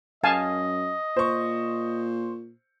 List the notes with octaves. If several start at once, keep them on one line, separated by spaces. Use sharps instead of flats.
F#2 D#5 F5 G#5 A5
A#2 C5 C#6